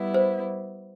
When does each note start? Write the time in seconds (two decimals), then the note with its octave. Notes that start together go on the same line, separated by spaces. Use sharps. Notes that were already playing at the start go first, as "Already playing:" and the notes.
Already playing: G3 B3 E4
0.14 C5